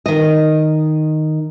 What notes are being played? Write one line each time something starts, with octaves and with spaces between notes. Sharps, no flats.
D#3 D#5